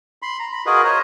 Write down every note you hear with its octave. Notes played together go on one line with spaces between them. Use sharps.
B5 C6
A#5
B5
F4 F#4 G#4 A#4 B4 D#5
C5 C#5 D#5 A#5